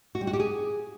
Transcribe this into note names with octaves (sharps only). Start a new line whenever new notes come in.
F#4
G3
F#4
G4
G#4